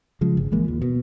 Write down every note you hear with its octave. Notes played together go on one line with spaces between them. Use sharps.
C#3 F3 G#3
G1
A#1 E3 G#3 A#3
D#2 A#2
B2